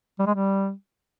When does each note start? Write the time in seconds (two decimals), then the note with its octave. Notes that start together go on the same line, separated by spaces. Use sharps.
0.19 G3
0.27 G#3
0.34 G3